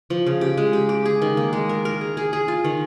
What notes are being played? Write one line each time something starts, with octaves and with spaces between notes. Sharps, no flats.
F3
C#3
G4
G#3
G4
G4
G#4
D#3
A#3
G#3
A#4
A#4
G#4
G#4
G#4
F4
D#3